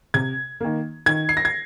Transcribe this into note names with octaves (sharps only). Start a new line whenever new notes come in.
C3 G#6
D#3 A#3
D#3 G#6
C7
A#6
G#6